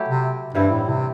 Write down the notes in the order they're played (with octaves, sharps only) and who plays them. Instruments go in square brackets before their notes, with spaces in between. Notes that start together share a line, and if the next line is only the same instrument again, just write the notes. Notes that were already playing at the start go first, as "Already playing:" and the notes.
Already playing: [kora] F#3 A3 E4 G4
[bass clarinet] C3
[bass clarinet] G2 [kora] E3 G3 C4 E4
[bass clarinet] A2
C3